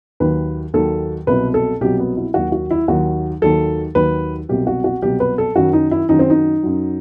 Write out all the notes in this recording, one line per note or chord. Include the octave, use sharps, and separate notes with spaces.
D#2 D#3 F#3 B4
D#2 D#3 F#3 A4
C2 B2 F#3 B4
A4
C2 B2 F#3 G4
B3
E4
D#2 D#3 F#3 F#4
F#4
E4
D#2 D#3 F#3 F#4
D#2 D#3 F#3 A4
D#2 D#3 F#3 B4
C2 B2 F#3 G4
F#4
F#4
C2 B2 F#3 G4
B4
A4
F#2 D#3 F#3 F#4
D#4
E4
F#2 D#3 F#3 D#4
C4
D#4
F#2 F#3